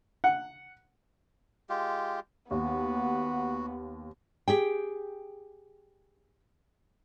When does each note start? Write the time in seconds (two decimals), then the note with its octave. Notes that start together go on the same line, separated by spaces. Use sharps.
0.24 F#5
1.69 G#3 F4 G4
2.51 D#2 B3 F#4
4.48 G4 G#4 G5